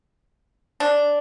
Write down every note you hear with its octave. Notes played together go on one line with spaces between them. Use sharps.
D4